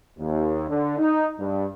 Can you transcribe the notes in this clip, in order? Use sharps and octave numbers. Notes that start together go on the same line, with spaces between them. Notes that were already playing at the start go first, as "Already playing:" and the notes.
D#2
D3
D#4
G2